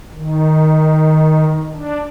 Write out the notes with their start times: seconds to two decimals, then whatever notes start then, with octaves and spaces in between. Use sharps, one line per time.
0.14 D#3
1.74 D4